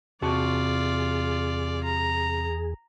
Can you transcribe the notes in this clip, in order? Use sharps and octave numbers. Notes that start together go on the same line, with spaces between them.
E2 C3 F4 F#4 G#4 D5 A5
A#5